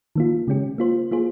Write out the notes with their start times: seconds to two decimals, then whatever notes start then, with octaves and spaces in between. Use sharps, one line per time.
0.16 D#3 A#3 F4
0.47 C#3 G#3 C#4 G4
0.78 A#3 F4 C5
1.11 A#3 F4 G#4 C5